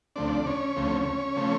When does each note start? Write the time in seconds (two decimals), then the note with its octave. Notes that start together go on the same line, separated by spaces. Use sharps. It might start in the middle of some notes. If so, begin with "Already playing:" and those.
0.16 D2 C#3 F3 A3 C4 D4 D5
0.46 C#4 C#5
0.76 D2 C#3 F3 A3 C4
1.36 C#3 F3 A3 C4